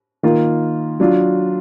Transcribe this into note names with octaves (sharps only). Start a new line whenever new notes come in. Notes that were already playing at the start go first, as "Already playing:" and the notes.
D#3 A#3 F4
F#3 D4 F4